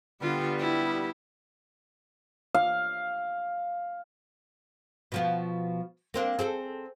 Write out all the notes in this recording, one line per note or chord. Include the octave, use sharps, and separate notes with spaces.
D3 G3 B3 F4
E4
F5
B2 F3 B3
A#3 C4 D4
C4 G#4 A4